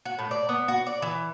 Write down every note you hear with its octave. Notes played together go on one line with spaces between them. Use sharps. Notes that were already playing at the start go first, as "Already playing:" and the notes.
F#4
A2
D5
B3
F#4
D5
E3